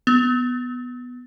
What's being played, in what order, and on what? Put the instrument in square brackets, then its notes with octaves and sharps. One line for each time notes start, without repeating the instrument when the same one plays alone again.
[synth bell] B3